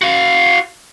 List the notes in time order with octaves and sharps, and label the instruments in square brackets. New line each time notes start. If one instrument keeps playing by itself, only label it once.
[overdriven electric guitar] F#4 F5